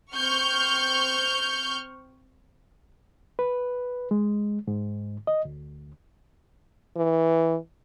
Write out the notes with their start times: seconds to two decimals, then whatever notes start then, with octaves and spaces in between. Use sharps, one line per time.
0.15 C4 C#6 F6 G6
3.39 B4
4.11 G#3
4.67 G#2
5.27 D#5
5.45 D2
6.96 E3